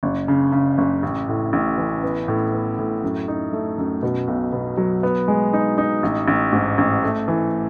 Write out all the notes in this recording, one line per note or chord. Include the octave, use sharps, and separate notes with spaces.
F#1
C#3
C#3
F#1
A1
A2
A1
E3
B3
A2
B3
A2
F#2
D#4
A3
F#2
B2
B1
B2
F#3
B3
G#3
D#4
D#4
A1
A1
G#2
A1
A3
E3